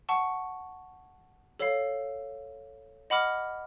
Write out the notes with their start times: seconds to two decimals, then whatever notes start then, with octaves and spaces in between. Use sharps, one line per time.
0.09 F#5 A5 C#6
1.60 A4 C#5 F5
3.10 D#5 F#5 B5 D6 F6